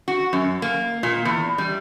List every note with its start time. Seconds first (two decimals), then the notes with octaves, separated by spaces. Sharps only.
0.08 F#4
0.33 F#2
0.62 A#3
1.03 A#2
1.25 E2
1.58 G3